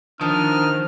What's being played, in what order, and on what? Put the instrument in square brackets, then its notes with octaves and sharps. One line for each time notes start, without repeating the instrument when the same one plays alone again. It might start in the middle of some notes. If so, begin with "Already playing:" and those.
[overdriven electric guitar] D#3 [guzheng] F3 [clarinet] D4 [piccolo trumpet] F6